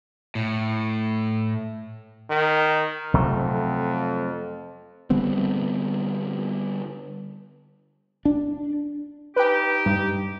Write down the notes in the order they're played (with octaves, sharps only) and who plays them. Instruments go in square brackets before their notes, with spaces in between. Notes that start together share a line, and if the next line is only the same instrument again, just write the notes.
[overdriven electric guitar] A2
[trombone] D#3
[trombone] F2 [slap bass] C3 F#3 A3
[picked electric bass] D3 G3 B3 C4
[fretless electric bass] D4
[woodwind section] D#4 G4 [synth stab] B4 G5
[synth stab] G2